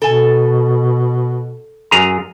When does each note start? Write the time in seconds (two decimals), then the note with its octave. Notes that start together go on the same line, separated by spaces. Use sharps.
0.02 B2 A4 G#5
1.91 F#2 G#4 A#5